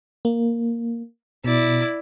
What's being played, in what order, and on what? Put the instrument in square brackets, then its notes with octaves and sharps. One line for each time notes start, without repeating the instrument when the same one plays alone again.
[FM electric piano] A#3
[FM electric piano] B2 [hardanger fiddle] E4 D5